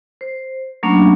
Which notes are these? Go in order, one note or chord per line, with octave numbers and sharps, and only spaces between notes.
C5
F#3 A3 A#3 C#4 D4 B5